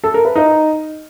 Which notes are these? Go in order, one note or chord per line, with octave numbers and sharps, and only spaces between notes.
A4
A#4
B4
D#4